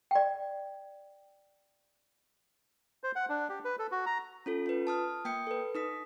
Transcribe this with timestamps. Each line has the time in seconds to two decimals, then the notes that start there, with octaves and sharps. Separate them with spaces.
0.11 D5 G5
3.03 C5
3.16 F#5
3.29 D4
3.50 G4
3.65 B4
3.79 A4
3.92 F#4
4.06 A#5
4.46 C#4 F4 A4
4.66 F4 B4
4.87 A5 D#6 F6
5.25 A#3 G5 D#6 G6 C#7
5.47 A4 B4
5.75 D#4 D#6 B6